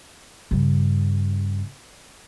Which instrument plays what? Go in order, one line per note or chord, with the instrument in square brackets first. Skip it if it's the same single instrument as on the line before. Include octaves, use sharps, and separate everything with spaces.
[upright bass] G2 C#3